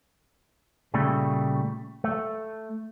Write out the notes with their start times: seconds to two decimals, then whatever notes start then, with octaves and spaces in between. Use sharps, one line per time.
0.94 A#2 C#3 G3 A3
2.04 A3